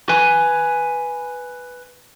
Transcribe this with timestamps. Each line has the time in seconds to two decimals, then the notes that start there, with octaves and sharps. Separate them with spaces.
0.09 B4 G#5